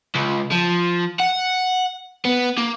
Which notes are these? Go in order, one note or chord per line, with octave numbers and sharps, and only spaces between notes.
C#2
F3
F#5
B3
A#3